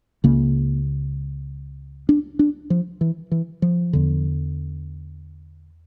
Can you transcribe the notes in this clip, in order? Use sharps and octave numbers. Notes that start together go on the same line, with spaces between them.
C#2 C#3 A#3
D4
D4
F3
E3
E3
F3
E2 D3